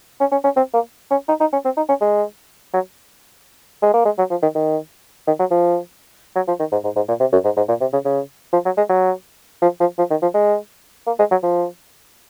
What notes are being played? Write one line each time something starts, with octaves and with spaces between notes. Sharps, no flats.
C#4
C#4
C#4
C4
A#3
C#4
D#4
D#4
C#4
C4
D#4
C#4
G#3
F#3
G#3
A#3
G#3
F#3
F3
D#3
D#3
D#3
F#3
F3
F#3
F3
D#3
G#2
G#2
G#2
A#2
C3
F#2
G#2
G#2
A#2
C3
C#3
C#3
F3
F#3
G#3
F#3
F3
F3
F3
D#3
F3
G#3
A#3
G#3
F#3
F3